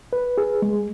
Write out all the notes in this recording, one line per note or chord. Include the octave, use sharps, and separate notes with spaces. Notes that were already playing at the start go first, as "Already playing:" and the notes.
B4
G#4
G#3